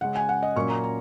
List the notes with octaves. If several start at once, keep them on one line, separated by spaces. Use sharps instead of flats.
C#3 G#3 C#4 F#5
G#5
F#5
D#5
A#2 F#3 A#3 C#4 C#6
A#5
A#5